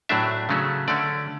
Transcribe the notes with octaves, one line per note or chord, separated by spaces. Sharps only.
A2 F#3 A3 D4 E5
C#3 F#3 A3 C#4
D3 A3 C#4 D5